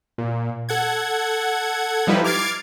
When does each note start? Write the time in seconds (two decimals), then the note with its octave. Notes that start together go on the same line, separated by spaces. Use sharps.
0.18 A#2
0.69 A4 F#5 G#6
2.07 F3 G3 D#4 E4 B4
2.24 D6 F6 G#6 A6 C7 D7